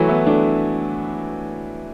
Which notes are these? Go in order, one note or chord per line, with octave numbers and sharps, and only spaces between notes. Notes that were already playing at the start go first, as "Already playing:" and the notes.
Already playing: E3 F#3 A3
B3 E4
A3 D4